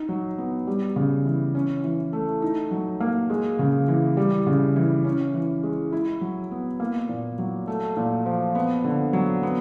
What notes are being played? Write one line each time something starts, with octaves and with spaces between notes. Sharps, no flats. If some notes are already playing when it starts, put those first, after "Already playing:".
Already playing: D#4
F#3
B3
G3
C#3
E3
C#4
E3
A3
D#4
F#3
A#3
G#3
C#3
E3
G3
C#3
E3
C#4
E3
G#3
E4
F#3
B3
A#3
A#2
F#3
A3
A#2
F3
B3
D3
F#3
B3